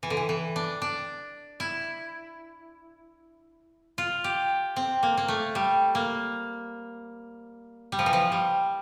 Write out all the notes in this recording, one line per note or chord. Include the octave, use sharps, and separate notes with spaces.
E3
D3
E3
E3
D4
D4
E4
F4
G4
C4
A#3
A#3
A3
G3
A#3
G3
F3
E3
F3
G3